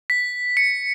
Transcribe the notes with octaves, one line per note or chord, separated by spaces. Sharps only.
B6
C#7